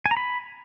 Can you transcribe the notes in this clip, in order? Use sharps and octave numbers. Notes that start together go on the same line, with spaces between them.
G#5
A#5
B5